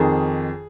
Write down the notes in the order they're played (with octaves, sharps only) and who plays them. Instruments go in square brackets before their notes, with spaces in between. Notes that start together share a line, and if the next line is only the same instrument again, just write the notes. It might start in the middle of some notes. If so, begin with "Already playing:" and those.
Already playing: [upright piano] F2 D#3 G#4